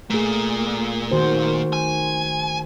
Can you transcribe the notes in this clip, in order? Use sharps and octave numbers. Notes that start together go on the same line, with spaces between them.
A#2 A3 G#4
D#3 F#4 C5
G#5